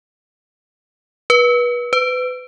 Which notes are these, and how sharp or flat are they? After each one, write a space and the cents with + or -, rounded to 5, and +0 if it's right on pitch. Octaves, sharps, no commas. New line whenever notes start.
B4 -30
B4 +30